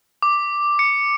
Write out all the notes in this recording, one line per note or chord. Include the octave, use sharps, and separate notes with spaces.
D6
C#7